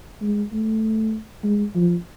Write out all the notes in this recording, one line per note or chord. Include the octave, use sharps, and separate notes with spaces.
G#3
A3
G#3
F3